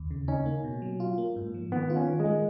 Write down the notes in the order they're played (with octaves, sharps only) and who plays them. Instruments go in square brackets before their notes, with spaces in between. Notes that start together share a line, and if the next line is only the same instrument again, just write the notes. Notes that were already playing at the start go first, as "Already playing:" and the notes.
Already playing: [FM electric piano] D#2
C#3
[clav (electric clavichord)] C#4 [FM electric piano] D#4
[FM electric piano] A#3
B2
F#3
F4
A#3
G#2
F3
[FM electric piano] D#3 [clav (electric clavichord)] B3
[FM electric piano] F4
[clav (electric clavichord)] C#4
[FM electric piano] D#3
[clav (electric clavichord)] G#3
[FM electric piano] A#3